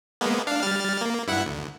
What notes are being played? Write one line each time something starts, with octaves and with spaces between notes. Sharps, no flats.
G#3 A#3 B3
D4 F5
G3 F6 A6
A#3
G2 E4 F#5
D2